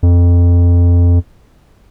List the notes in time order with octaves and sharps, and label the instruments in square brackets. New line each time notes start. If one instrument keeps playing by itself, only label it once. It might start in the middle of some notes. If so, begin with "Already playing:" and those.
[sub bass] F2